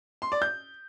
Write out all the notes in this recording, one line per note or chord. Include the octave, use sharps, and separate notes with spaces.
C6
D5
G6